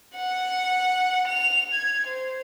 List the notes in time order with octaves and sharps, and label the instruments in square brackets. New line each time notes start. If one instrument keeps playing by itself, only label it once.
[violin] F#5
F7
G#6
C5